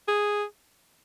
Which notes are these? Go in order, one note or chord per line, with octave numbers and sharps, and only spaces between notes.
G#4